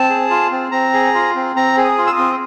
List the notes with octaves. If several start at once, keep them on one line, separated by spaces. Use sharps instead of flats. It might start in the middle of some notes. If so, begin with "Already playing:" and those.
Already playing: C4 A5
G#4
F4
C4
C4 A#5
G#4
F4
C4
C4 A#5
G#4
D#6
F4
E6
D#6
C4